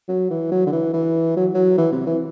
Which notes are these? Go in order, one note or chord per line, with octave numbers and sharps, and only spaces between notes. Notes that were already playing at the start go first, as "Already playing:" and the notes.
F#3
E3
F#3
D3
E3
E3
F#3
F#3
E3
C3
E3